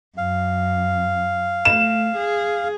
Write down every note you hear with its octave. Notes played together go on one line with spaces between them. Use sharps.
F#2 F5
A3 E7
G#4